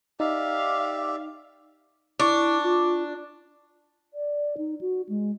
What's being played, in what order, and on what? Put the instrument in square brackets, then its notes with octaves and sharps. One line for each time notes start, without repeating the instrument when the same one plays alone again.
[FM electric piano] D#4 [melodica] G4 D5 E5 [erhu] F5
[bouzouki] D4 [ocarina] E4 [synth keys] C#6 D6
[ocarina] F4
[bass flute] D5
D#4
F#4
G#3